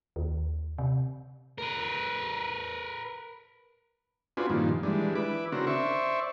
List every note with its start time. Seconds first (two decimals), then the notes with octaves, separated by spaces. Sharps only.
0.16 D#2
0.78 C3
1.58 A#4 B4
4.37 C4 D4 F4 F#4 B4 G#5
4.50 G2 A#2 D#3 F3
4.83 E3 G3 G#3 D4
5.15 E4 B4 D6
5.52 C#3 C4 D4 F#4 A#4
5.67 C5 D5 E5 C#6